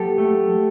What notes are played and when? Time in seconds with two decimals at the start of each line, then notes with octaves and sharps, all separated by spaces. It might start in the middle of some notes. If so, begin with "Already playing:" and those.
Already playing: F#3 A#3 G4 A4
0.18 A3